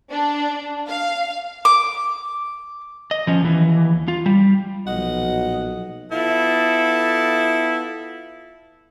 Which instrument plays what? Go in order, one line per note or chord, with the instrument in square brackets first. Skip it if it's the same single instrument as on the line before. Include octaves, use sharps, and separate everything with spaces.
[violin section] D4
F5
[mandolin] D6
[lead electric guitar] D#5
F3 C#4
D#2 E3
F4
G3
[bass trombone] B1 [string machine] A#2 F3 F#3 [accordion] D#5 [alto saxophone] F#5
[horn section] B3 E4 F4 A4